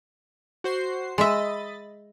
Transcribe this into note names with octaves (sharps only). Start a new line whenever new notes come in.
F#4 C5 C7
G#3 D#5 E5 B5 A6